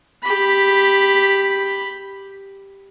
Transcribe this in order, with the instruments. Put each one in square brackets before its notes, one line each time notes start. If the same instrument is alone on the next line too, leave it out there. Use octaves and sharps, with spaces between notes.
[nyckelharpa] G4 B5